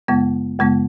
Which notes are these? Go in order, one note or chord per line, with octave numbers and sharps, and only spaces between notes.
F#2 C#3 G#3 B3
F#2 C#3 G#3 B3